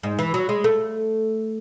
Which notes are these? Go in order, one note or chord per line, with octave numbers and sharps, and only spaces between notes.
G#2
E3
F#3
G#3
A3